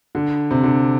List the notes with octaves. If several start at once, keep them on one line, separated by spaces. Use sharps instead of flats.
D3
C3
D3